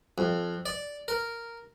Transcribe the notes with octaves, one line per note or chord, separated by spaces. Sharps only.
F2
D5
A#4